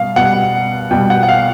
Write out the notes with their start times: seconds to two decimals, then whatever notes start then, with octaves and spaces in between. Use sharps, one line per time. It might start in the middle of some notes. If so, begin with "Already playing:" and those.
Already playing: B2 G3 F5
0.16 B2 G3 F#5
0.91 B2 G3 G5
1.10 F#5
1.23 F#5
1.29 F5